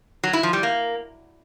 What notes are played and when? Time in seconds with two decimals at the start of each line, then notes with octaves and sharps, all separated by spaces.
0.23 F#3
0.33 E4
0.43 F3
0.53 G3
0.63 A#3